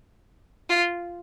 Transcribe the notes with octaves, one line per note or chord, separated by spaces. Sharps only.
F4